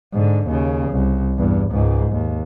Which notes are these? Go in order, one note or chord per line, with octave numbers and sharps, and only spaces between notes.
G#2 D3
D#2 C#3
C2
E2 G2
C#2 G#2
D#2